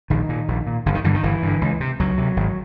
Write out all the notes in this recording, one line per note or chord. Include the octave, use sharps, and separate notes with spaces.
A#1 D#3
A#2
A#1
A#2
G1 D3
D#3
G2 D3 E3
D#3
G1 E3
G2 D3
C#2
C3
C#2 F#3
C3
G#1